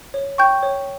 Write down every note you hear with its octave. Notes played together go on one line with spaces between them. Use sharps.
C#5
G5 C#6 G6
C#5